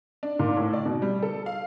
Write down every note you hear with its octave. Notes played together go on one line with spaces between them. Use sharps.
D4
A#2
A2
D5
B2
G3
A4
F5